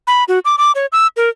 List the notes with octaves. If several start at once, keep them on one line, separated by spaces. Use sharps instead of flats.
B5
F#4
D6
D6
C#5
E6
A#4